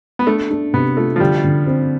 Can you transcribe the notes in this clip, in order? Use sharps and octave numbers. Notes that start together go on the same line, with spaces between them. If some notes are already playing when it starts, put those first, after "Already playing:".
B3
A3 D4
D4
C3 B3
A3 F4
F3
D3 G3
D3
C4